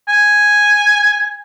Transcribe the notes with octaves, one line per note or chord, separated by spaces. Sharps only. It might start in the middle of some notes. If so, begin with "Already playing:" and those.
G#5